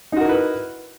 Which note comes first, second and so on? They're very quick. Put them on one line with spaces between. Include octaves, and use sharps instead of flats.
D#4 F#4 A#4 E4 B4